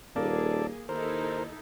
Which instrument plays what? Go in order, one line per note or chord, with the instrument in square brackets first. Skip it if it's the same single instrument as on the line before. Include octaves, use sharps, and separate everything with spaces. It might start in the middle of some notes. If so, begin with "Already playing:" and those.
[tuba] D#1 [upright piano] A#3 [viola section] G#4 [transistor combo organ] A4 D5
[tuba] D#2 [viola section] D#4 E4 A4 [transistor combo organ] A#4 C5